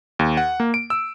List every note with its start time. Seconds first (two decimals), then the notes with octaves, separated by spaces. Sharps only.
0.19 D#2
0.37 F#5
0.60 A#3
0.74 D7
0.90 E6